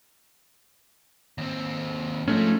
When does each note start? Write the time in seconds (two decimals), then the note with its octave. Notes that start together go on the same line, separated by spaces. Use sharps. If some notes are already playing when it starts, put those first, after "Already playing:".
1.38 D#2 C4
2.28 F3 G#3 A3 C#4 D#4